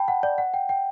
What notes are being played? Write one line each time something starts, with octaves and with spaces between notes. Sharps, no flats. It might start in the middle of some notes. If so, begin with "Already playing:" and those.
Already playing: G5 A5 B5
F#5
D5
F#5
G5
G5